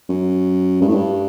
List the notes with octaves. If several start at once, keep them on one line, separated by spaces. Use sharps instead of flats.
F#2
G2
A2
G2